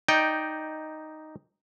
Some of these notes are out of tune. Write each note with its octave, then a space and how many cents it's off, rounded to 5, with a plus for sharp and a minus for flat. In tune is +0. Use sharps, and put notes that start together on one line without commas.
D#4 +0 D5 -5 G5 +0